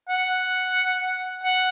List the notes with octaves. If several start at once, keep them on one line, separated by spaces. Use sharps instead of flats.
F#5
F#5